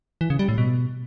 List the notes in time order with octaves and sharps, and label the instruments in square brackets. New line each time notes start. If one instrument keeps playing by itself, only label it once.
[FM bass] E3
C#3
G3
A2
B2